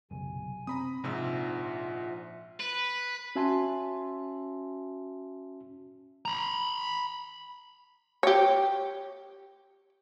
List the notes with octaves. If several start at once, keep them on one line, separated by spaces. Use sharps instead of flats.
F#1 B1 C3 G#5
C4 A#5 B5 D#6
A#1 G#2 C3 F4 E5 F#5 E6
B4
C#4 F#4 E5 G#5 A5 C6
A#5 B5
G4 C#5